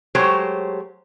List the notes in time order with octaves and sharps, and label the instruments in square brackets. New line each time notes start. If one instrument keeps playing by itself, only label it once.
[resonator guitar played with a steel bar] F#3 G#3 A3 G4 C5 C#5